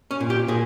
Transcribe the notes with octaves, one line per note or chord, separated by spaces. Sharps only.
C#4
A#2
G4
A#2 G#4